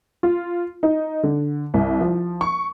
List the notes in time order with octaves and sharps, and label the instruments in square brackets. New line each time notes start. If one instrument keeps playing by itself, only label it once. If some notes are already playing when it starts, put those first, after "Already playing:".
[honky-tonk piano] F4
D#4
D3
C2
F3
C#6